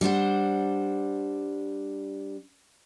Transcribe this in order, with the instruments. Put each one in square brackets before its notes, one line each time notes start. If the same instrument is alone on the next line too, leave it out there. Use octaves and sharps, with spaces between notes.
[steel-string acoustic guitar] G3 D4 C5 F#5